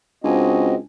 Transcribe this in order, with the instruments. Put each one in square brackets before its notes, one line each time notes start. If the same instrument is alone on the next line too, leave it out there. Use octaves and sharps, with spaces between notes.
[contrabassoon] C#2 [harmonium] C4 F#4 D#5 [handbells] D4 G#5